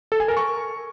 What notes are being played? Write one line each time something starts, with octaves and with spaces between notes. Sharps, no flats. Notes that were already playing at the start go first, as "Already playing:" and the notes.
A4
G#5
A#4
C#6